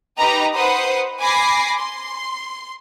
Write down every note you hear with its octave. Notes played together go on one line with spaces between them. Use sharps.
D#4 G4 B4 D#5 A#5
B4 C5 F#5 D#6
G#5 B5 D6 A#6 C7
C6